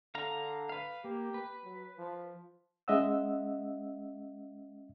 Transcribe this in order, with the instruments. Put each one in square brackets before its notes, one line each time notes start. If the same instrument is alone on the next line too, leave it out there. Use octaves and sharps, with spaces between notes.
[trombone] D3 [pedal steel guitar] F5 A#5
[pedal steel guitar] B4 F5
[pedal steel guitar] A#3 [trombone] G4
[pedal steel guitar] B4
[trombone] F#3
F3
[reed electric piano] G#3 C#4 D#5 E5 F#5 E6